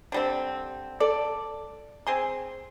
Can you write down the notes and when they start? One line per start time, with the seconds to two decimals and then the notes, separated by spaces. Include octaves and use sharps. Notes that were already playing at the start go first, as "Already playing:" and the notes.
0.12 D3 G3 C4
1.00 A4 D5
2.07 C4 G#4 C6